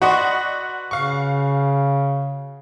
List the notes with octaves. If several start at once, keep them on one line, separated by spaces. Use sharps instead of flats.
F#4 B4 D5 D#5 F#5 C6
C#3 F5 C#6